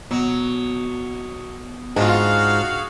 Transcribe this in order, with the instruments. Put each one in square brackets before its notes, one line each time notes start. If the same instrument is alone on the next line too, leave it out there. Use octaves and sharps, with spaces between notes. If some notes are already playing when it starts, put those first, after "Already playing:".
[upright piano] B2 [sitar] F#3
[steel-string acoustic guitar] G#2 [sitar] D4 F4 [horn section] F#4 G#4 F5